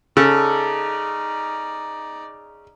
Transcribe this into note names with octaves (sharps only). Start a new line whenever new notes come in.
C#3 D#4 A4 D5